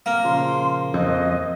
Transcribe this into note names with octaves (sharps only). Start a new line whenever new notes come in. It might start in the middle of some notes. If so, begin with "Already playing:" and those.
A#3 F6
A#2 C#3 F3 C6
F2 D#5